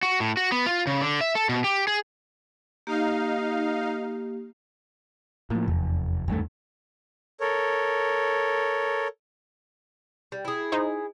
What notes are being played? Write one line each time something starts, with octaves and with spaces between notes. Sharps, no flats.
F#4
A2
F#4
B3
F4
C#3
D3
E5
A4
B2
G4
G#4
A#3 D#4 G4 F5
A2 F3 A#3
F1 E2
G#1 G2 A3
A4 A#4 C#5
G3
E4 G#4
D#4 C5